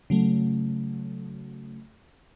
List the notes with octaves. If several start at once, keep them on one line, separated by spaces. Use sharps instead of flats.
C#3 F#3 A3